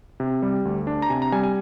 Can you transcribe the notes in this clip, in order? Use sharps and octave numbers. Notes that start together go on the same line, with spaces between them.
C3
G3
D2
D4
A#5
C3 G#5
A#5
G3 G#5
G#5